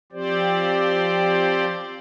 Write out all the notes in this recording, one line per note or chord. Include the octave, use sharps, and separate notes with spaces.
F3 C4 G4 C5 D5